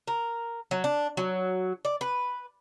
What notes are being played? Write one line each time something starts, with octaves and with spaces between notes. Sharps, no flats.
A#4
F#3
D4
F#3
D5
B4